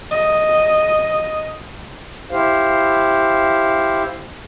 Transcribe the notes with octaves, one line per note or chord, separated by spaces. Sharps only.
D#5
E4 G4 C5 F5